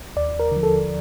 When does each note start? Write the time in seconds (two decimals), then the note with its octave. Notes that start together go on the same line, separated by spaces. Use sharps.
0.16 D#2 D5
0.39 A#4
0.52 D3 F3
0.63 A4